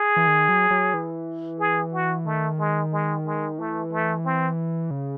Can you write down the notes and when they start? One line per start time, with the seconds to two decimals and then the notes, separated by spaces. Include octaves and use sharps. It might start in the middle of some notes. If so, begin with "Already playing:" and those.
Already playing: G#4
0.16 E3
0.27 D#3
0.49 F#3
0.71 F#3
0.94 E3
1.59 G#4
1.93 F#4
2.26 D#3 A3
2.59 G#3
2.93 G#3
3.26 G#3
3.59 E3 A3
3.92 A3
4.25 C4
4.91 C#3